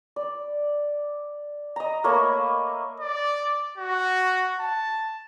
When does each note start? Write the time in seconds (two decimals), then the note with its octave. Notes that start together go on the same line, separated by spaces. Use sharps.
0.16 D5
1.76 D#5 A#5
2.04 A3 A#3 C#5 B5
3.00 D5
3.78 F#4
4.60 A5